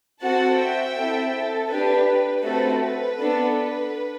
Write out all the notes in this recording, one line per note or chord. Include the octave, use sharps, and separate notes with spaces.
C4 F#4 A4 F#5 A5
E5 G5
C4 E4 A4
A4
D4 G4 B4
A3 C4 F#4 A4 B4
B4
B3 D4 A4
B4